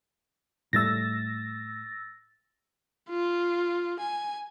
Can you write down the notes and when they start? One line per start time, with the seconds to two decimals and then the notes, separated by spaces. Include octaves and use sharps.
0.73 A2 G3 A3 E6 A6 A#6
3.09 F4
3.99 G#5